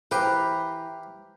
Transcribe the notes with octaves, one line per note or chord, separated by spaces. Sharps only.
E3 G4 B4 C5 F5 A#5